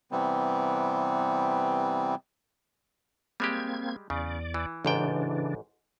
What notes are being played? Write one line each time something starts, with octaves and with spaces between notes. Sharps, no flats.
C3 E3 G3 B3 C4
G3 G#3 A#3 C4 G4 G#6
E2 C#3 D5
E3
A1 G#2 C#3 E3 D4 G5